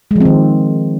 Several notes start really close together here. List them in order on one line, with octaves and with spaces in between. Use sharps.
G#3 F3 C4 D#3